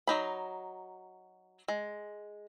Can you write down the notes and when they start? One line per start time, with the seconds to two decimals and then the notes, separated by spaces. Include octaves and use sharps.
0.07 F#3 D#4 B5
1.68 G#3